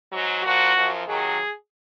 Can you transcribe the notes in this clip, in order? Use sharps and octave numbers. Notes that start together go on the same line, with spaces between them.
G#2 F#3
A#2 F3 F#4
F#2 F3
D#2 D#3 F#3 G#4